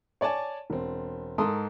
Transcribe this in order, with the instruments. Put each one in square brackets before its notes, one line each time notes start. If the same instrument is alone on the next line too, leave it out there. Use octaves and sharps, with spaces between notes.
[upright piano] C#5 D5 G#5 A5
E1 C4
G#2 A4 A#4 C6 D#6